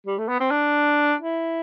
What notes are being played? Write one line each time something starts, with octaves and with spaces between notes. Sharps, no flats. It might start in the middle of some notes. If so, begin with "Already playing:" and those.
G3
A3
B3
C4
D4
E4